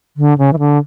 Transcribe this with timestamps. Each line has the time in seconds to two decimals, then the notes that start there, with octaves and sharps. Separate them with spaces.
0.17 D3
0.38 C#3
0.53 E3
0.59 D3